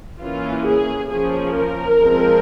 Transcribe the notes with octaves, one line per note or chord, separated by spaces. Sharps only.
E3 A#3 C#4 F4
G#4
F3 A#3 C#4 G#4
A#4
F3 G#3 C4